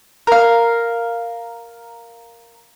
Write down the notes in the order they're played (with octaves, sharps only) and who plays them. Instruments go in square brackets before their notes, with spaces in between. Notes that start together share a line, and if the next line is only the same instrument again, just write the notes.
[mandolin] A#4 F5